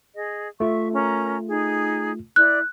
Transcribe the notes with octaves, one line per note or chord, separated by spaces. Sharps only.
G#4 D#5
A3 F4 E5 C#6
C#4 A#4 A#5
D#4 G#4
E4 D5 F#6